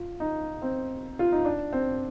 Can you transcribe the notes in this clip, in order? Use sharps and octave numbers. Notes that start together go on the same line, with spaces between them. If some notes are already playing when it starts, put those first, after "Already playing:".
Already playing: F4
D#4
C4
F4
D#4
D4
C4